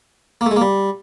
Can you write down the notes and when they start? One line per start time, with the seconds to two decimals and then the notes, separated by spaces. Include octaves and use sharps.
0.41 A#3
0.46 A3
0.51 G#3
0.56 A#3
0.61 G3